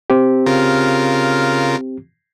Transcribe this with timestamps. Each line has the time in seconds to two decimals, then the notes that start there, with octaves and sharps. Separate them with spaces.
0.10 C4 G4
0.46 C#3 F4 A#4